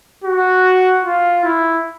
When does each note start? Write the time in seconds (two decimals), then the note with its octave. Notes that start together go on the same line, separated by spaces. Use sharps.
0.24 F#4
1.04 F4
1.44 E4